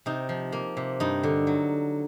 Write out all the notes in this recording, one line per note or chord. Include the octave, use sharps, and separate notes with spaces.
C3 D#4
F3
A#3
C3
G2 D#4
D3
F#3